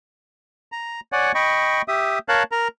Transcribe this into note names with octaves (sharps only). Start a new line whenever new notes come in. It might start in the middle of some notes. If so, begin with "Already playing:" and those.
A#5
C#5 D5 F#5 G#5
D#5 G5 B5 C#6
G4 E5 D#6
A#4 C#5 F5 A5 F#6
A#4 A#5